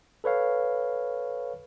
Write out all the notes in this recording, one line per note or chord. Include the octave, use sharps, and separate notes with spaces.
A4 B4 C#5 F5